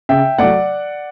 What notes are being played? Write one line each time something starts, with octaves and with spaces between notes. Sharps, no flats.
C#3 E5 G5
F#3 A3 D5 F#5